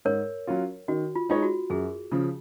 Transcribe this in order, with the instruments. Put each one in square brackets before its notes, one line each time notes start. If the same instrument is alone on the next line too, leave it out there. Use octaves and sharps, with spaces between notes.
[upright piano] G#2 [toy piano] A#4 C#5
[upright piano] F#3 C#4 F4
[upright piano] D#3 [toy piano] F#4
[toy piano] F4
[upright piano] G#3 D#4 G#4 C#5 [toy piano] F4
[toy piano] F#4
[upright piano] F#2 [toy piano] G#4
[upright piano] C#3 F3